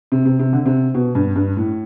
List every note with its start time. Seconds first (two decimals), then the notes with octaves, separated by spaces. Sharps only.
0.12 C3
0.25 C3
0.39 C3
0.53 D3
0.66 C3
0.94 B2
1.15 G2
1.36 G2
1.57 A2